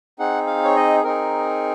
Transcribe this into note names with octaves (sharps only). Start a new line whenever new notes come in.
C4 D#4 G#4 F#5
F5
C#5
D#5
C4 D#4 G#4 A#4